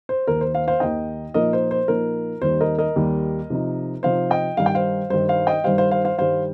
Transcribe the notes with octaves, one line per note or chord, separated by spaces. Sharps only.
C5
D#2 D#3 A#3 D#4 A#4
C5
C5 F5
C5 F5
D#2 D#3 A#3 D#4 D#5 G5
A#2 F3 A#3 D#4 A#4 D#5
C5
C5
A#2 F3 A#3 D#4 A#4
D#2 D#3 G3 C5
A#4 D#5
A#4 D#5
D#2 D#3 G3
C3 F3 D#4
C3 F3 D#4 C5 F5
D#5 G5
G2 D#3 G3 D#4 F5
G5
C5 F5
G2 D#3 G3 D#4 C5
C5 F5
D#5 G5
G2 D#3 G3 C5 F5
C5 F5
C5 F5
C5 F5
G2 D#3 G3 C5 F5